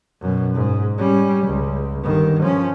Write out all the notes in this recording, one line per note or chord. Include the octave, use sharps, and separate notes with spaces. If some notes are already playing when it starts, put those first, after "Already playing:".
F#2 B2
G#2
G3 C#4
C#2
G1 D#3
F3 C#4